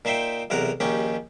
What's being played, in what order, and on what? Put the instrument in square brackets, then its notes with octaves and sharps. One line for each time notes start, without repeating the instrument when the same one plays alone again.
[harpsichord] A#2 D#4 C5 E5 G5
B1 E2 C3 A#4 F#5 A#5
A#1 D#2 C#4 D#4 G4